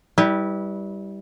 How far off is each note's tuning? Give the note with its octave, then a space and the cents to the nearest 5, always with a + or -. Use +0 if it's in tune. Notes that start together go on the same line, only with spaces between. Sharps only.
G3 +0 E4 -25 B4 +0